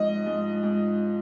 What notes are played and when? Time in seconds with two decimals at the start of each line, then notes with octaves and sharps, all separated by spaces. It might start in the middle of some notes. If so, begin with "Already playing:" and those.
Already playing: G#2 F3 D#5
0.26 G#2
0.63 G#2